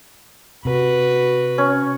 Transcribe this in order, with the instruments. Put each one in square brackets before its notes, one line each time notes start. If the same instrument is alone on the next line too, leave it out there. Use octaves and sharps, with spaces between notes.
[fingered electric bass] C3 [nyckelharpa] F#4 B4
[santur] C#4